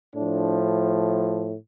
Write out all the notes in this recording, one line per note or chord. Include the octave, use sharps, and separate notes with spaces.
A2 F3 D4